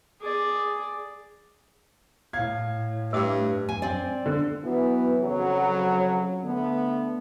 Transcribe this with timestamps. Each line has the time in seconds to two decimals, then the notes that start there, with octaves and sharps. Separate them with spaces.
0.21 G#4 D5
2.33 A2 F5 G#6
3.13 G2 A3 D6
3.69 G#5
3.82 C4 D5
4.26 D3
4.62 E3 F#3 B3
5.20 F2 C#3 F#3
6.44 D3 A3 B3